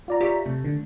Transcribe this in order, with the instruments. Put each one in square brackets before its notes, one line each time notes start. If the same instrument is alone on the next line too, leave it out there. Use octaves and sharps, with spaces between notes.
[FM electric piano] F4 D5 A#5
[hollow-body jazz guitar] G4 C#5 E5
[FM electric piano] C3 [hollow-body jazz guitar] A3
[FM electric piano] D3